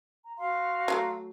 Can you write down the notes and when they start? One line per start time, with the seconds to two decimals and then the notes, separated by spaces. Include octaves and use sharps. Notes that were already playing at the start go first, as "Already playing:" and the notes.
0.25 A#5
0.37 F#4 F5 C6
0.88 F#3 G3 A3